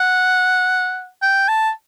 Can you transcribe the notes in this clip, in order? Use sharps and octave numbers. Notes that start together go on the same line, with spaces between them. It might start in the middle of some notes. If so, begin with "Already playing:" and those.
Already playing: F#5
G5
A5